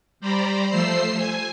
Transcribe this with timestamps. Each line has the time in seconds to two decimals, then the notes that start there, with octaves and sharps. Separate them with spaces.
0.20 G3 C5 D5 A#5 B5
0.69 F3 A3 C5 E6 C7
1.17 G#5